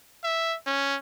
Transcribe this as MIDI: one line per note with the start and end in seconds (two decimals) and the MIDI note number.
0.24 0.56 76
0.67 0.97 61